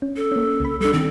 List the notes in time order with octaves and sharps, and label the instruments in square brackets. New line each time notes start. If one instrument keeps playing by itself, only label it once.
[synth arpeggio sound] C#4
[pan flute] A4
[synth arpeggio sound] A#3 C#4
C#2 B5
[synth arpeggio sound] G3 D4 [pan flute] A4
[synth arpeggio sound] D#3 [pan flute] C4